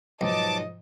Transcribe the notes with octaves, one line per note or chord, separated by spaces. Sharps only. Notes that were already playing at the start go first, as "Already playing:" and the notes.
B1 G#2 F3 D#5 A5 D6